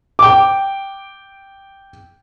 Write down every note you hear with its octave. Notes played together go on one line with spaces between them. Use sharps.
G5 D6